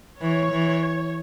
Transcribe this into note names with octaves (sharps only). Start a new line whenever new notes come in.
E3 C#5
E3